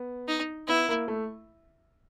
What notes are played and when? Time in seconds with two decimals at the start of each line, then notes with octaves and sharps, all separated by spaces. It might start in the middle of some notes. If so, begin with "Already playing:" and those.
Already playing: B3
0.28 D#4
0.67 B3 E4
0.89 A#3
1.08 A3